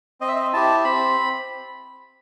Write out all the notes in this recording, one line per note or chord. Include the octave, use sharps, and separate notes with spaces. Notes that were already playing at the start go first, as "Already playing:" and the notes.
C4 D#5
E5
D#5
E4 G4 A5
C4 B5